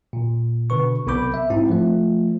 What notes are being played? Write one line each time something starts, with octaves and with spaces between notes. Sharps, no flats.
A#2
B2 D3 B4 C#6
B1 C3 B3 B5 D6 G6
E5
G#2 C4 E4
F3 A3